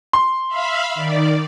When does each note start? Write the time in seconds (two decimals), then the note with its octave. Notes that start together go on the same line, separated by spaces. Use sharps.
0.13 C6
0.48 E5 F5 B5
0.95 D#3 D5